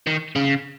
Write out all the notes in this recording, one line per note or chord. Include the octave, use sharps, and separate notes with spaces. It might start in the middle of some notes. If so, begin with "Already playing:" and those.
D#3
C#3